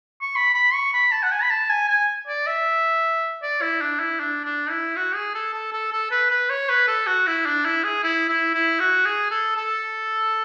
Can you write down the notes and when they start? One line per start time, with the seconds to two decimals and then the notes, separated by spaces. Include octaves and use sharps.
0.22 C#6
0.36 B5
0.54 B5
0.74 C#6
0.94 B5
1.12 A5
1.23 F#5
1.32 G#5
1.42 B5
1.50 A5
1.70 G#5
1.89 G#5
2.28 D5
2.47 E5
3.42 D5
3.62 E4
3.81 D4
4.00 E4
4.20 D4
4.45 D4
4.70 E4
4.96 F#4
5.15 G#4
5.35 A4
5.53 A4
5.72 A4
5.93 A4
6.11 B4
6.31 B4
6.50 C#5
6.69 B4
6.87 A4
7.07 F#4
7.27 E4
7.46 D4
7.65 E4
7.83 G#4
8.03 E4
8.28 E4
8.54 E4
8.80 F#4
9.05 G#4
9.31 A4
9.57 A4